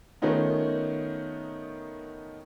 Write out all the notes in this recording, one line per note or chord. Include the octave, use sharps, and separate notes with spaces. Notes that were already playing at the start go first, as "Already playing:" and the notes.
D#3 A3 B3 C#4 D#4 F4